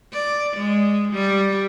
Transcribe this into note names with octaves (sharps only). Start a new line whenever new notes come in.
D5
G#3
G3